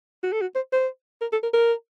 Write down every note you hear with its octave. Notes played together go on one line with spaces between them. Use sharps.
F#4
A4
F#4
C5
C5
A#4
A4
A#4
A#4